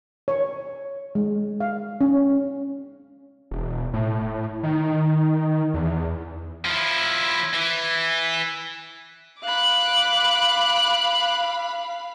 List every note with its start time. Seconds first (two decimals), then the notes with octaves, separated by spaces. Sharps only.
0.28 C#5
1.15 G#3
1.60 F5
2.01 C#4
3.51 E1
3.93 A2
4.63 D#3
5.74 E2
6.65 F3 E4
7.54 E3
9.43 F5 B5 D6 F#6